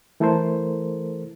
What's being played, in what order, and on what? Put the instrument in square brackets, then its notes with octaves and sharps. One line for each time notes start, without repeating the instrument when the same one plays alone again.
[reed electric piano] E3 A3 E4 A4 A#4 C5